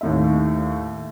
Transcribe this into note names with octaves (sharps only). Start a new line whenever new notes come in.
D#2 A2 E5